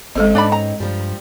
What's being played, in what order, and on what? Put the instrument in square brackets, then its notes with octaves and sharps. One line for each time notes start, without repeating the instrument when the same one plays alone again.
[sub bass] G#1 [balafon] G#3 A4 D#5 [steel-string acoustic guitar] C4 C#4 D#4
[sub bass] G#2 [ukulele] D4 D5 B5
[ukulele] A#5
[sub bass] G2 [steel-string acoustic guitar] F3 G3